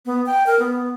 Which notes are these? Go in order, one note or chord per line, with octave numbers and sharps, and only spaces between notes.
B3
G5
A#4
B3